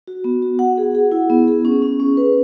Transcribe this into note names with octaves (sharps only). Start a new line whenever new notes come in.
F#4
B3
F#4
F#5
G#4
G#4
E4
B3
G#4
C#4
C#4
C#4
B4